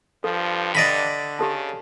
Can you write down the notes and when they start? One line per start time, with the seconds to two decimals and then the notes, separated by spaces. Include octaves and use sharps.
0.24 G2 F3 A4
0.75 D3 D5 D#5 B5
1.39 C#3 G4 A4 A5